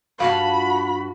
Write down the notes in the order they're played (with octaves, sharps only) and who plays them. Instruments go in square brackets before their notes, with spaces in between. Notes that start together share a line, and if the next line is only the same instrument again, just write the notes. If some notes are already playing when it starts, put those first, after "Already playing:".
[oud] G2 F4 [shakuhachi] F#4 [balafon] F5 [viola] B5